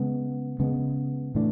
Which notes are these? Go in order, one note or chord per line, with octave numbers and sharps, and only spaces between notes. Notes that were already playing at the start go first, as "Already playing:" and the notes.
Already playing: C#3 G#3 B3
C#3 G#3 B3
A2 E3 A3 D4